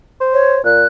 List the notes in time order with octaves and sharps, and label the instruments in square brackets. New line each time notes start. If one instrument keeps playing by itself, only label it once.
[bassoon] C5
[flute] C#5
[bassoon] A#2 [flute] F#6